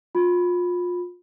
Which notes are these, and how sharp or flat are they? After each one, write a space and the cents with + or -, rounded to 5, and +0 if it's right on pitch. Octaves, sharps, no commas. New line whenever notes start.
F4 +30 B5 +0